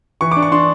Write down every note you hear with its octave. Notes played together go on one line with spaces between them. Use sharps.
E3 C#6
D6
D4
C#6
D4 C6